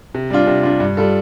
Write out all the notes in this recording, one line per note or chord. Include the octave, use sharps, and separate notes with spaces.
C3
G3 D4 F4
C3
G3 D4 F4
G2
G3 F4 A4